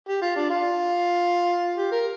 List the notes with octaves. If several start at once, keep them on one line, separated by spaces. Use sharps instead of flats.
G4
F4
D4
F4
G4
A#4